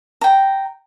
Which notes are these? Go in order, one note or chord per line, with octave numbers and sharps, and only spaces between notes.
G5 A#5